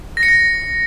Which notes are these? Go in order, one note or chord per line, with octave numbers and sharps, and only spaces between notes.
A#6
C#7
A#6